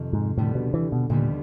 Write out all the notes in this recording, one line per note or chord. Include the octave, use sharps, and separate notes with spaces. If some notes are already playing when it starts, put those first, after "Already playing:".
Already playing: F2 C3 D#3
G#2
D#2 A2 D3 G3 B3
B2
E3
B2
D#2 A#2 D3 G3 B3